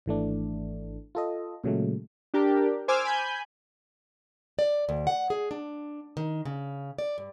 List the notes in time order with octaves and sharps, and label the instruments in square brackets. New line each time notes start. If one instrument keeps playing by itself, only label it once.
[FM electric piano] G#1 E3 A3 D4
F4 A4 D#5
A#2 C#3 F#3 G#3 A3
[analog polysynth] D4 G4 A#4
C5 G#5 D6 E6 F6
G#5 B5 G6
[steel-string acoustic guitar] D5
D2
F#5
G#4
D4
D#3
C#3
D5
G2